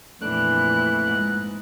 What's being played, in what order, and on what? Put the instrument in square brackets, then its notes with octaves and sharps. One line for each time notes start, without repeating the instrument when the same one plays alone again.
[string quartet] F2 A#2 E3 [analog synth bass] A3 [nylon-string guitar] D4 [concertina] F#6
[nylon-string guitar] G#2